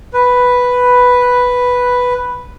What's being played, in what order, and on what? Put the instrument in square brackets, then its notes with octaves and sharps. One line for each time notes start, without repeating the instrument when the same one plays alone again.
[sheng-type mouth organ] B4